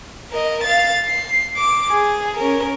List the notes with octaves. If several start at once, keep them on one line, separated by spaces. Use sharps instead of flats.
A#4 D#5
F5 A6
C7
D6
G#4
C#4 A#4